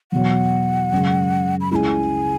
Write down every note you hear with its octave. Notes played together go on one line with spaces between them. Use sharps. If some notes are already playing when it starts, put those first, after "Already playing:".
E2 B2 F#3 F#5
F#2 C#3 G#3
B5
C#2 C#3 G#3 E4 G#4 G#5 B5